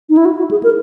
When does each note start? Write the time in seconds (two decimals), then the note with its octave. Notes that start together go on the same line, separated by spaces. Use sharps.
0.10 D#4
0.17 E4
0.25 F#4
0.38 F#4
0.51 G#4
0.63 A#4